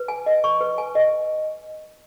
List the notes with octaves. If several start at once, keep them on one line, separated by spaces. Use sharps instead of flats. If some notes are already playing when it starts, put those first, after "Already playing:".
Already playing: B4
G#5
D#5
C#6
B4
G#5
D#5